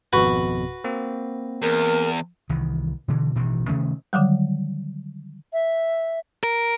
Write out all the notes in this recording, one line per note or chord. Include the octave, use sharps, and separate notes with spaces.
G#1 F2 B2 F#4 B4
A#3 C4
E2 A#4
C2 D#3 E3
B2 D3 E3
A1 B2 D#3 E3
C3 D#3 A3 C#4
D3 D#3 F#3 G3
E5
A#4